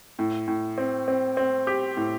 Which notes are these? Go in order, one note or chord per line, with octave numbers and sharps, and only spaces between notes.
A2
A2
C4
C4
C4
G4
A2